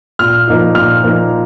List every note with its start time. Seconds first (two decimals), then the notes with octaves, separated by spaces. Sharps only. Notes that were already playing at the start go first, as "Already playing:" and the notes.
0.19 A#2 F6
0.48 F3 A#3 D#4
0.75 A#2 F6
1.03 F3 A#3 D#4